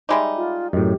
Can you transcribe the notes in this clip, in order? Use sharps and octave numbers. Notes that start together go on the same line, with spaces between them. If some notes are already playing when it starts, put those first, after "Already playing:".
G3 G#3 D#4 E5 B5 D6
F4
F#2 A2 G4 D#5